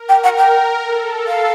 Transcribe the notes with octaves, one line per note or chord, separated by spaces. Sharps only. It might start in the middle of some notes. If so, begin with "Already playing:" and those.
Already playing: A#4
G5
F#5
G5
A4
F5